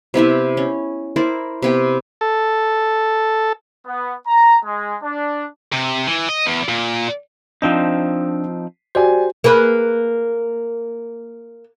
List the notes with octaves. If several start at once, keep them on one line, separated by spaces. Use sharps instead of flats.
C3 B3 E4 E5
C#4
E4 A#4 C5 D5
C3 B3 G5
A4
B3
A#5
G#3
D4
C3
E3
D#5
E2
A#2
F3 C4 D4 D#4 F4
F#4 G4 C5 D5 G#5
A#3 G#4 B4